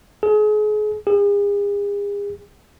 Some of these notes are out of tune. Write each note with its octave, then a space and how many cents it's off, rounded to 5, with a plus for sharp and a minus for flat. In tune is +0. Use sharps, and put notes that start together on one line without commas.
G#4 +35
G#4 -40